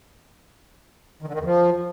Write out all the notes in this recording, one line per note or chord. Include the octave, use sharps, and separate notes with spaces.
D#3
D3
D#3
E2
F3